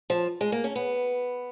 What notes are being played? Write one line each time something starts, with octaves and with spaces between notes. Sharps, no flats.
F3
G#3
A#3
C#4
B3